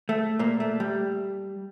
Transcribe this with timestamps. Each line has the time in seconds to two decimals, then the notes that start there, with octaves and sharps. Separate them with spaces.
0.09 A3
0.39 A#2 A#3
0.60 A3
0.80 G3